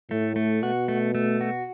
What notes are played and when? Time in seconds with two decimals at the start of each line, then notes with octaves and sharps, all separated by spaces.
0.10 A2 A3
0.36 A3
0.62 B2 F#4
0.88 A3
1.15 A3
1.41 F#4